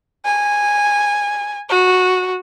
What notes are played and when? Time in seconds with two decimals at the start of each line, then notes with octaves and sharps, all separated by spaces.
0.25 G#5
1.69 F#4